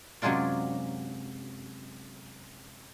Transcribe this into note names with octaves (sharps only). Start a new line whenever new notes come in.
F#2 C3 F#3 G#3 F4 D5